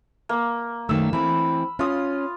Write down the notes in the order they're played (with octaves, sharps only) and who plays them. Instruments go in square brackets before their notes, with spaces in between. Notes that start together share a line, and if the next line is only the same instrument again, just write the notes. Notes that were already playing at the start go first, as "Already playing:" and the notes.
[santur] A#3
[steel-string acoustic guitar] F#2 D#3 A3 [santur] E6
[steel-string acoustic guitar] E3 C4 [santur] B5
[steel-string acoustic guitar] C#4 [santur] F4 F5 D#6